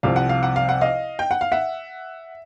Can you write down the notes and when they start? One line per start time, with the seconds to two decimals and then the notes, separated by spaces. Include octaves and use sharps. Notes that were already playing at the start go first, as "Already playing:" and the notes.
0.03 C2 C3 F3 F5
0.16 F#5
0.29 F5
0.43 F#5
0.56 F5
0.69 F#5
0.81 D#5 F5
1.19 G5
1.31 F#5
1.41 F5
1.52 E5 F#5